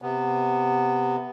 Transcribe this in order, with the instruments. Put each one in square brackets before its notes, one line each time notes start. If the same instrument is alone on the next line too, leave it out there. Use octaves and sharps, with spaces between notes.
[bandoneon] C3 B3